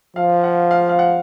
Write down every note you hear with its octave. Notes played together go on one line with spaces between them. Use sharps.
F3 F5
F#5
F5
F5
F#5